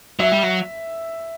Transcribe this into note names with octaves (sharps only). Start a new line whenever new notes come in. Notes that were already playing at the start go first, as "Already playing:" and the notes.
F#3 E5
G3
F#3